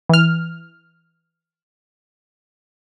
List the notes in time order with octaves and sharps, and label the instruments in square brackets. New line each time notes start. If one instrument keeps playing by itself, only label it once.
[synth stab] E3 F6